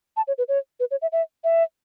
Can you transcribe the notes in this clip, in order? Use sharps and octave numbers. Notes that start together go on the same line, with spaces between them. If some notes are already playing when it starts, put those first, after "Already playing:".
A5
C#5
B4
C#5
B4
C#5
E5
E5
E5